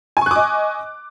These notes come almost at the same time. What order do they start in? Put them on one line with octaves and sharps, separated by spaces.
G#5 C#6 F#6 D6 D#5